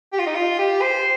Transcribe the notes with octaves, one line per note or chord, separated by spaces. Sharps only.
G4
F4
D#4
F4
G4
C5